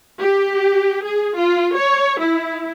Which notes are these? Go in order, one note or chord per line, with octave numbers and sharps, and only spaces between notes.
G4
G#4
F4
C#5
E4